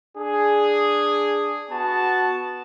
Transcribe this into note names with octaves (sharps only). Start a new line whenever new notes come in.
D4 G#4
B3 F#4 A5